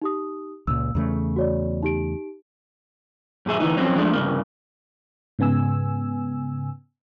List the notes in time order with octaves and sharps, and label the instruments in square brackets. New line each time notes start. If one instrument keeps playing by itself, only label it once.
[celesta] D#4 G4 D#6
[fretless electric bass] C#2 A#2 [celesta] E6
[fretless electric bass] E2 C#3 A3
[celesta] F#4 C#5 D5
D#4 G4 D7
[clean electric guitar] F#2 A#2 G#4 E5
D2 E3 D#4
F3 F#3 C4 C#4
F3 G#3 A3 D4
C2 G2 C#3 A#3
[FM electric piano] G#2 C#3 B3 G#5 E6